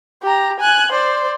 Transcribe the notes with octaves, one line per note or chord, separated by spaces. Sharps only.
G4 A#5
G#5 F#6
C5 D5